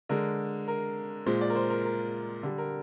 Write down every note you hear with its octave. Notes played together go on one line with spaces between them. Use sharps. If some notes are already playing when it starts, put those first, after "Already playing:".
D3 G#3 A#4
A#4
A#2 G#3 C5
D5
A#4
C5
A#4
A#4
D3 G3
A#4